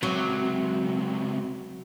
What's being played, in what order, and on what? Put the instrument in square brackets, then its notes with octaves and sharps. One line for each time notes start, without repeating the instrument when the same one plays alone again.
[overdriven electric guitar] C#2 C3 [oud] F#3